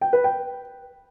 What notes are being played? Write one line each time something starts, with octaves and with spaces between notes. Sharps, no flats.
G5
B4
G5